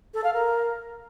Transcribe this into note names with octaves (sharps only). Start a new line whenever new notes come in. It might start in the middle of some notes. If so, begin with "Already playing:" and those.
A4
F5
A#4